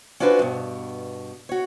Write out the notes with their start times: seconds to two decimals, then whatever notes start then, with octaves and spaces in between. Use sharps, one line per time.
0.20 C#4 D4 F4 F#4 B4 C5
0.39 G2 B2
1.49 F#4 C#5